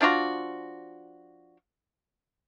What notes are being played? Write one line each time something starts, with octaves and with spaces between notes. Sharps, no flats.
F3 D4 F4 F#4